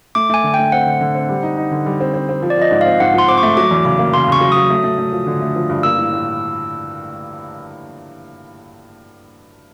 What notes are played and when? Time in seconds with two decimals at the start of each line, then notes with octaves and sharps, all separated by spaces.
0.15 A3 D6
0.30 A3 G#5
0.44 D3
0.54 A3 G5
0.72 C4 F#5
0.86 D3
1.01 D3
1.15 C4
1.29 G3
1.43 D#4
1.57 D#4
1.71 D3
1.86 G3
2.00 C4
2.14 C4
2.29 C4
2.42 F3
2.50 D5
2.57 F3 D#5
2.71 G#2
2.81 C4 F5
3.00 G#2 F#5
3.14 F3 C6
3.28 C4 D6
3.38 C#6
3.43 A3
3.57 F#3 D6
3.71 E2
3.85 C#3 D6
3.99 A#3
4.13 C#3 C6
4.28 C#3 C#6
4.41 F#3
4.52 F#3 D#6
4.70 A3
4.84 A3
4.98 A3
5.12 F3
5.27 D3
5.42 A3
5.56 F3
5.70 G2
5.83 A#3 E6
5.98 A2
6.13 A2